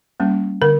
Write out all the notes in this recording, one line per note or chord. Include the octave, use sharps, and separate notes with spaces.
G3 A#3 C#4
D3 A#4